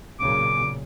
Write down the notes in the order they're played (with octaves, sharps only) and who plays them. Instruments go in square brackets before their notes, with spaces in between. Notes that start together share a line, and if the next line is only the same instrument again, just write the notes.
[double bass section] B1 A#2 C#3 [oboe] D6